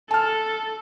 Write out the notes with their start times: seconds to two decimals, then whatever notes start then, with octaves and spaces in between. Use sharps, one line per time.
0.11 A4 A5 F6